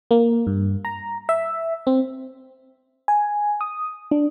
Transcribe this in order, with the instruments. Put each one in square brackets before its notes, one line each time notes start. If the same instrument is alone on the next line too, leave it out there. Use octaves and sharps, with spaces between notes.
[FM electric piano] A#3
G2
A#5
E5
C4
G#5
D#6
D4